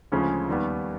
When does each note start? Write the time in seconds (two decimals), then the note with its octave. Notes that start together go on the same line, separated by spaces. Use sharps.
0.12 D2 C#3 F3 G#3 C#4
0.49 D#2 D#3 G3 B3